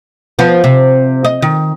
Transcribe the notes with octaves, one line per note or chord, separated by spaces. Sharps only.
F3 B3
C3
D#5
D#3